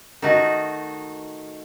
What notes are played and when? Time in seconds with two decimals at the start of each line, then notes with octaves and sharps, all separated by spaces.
0.22 D#3 A3 D#4 F#4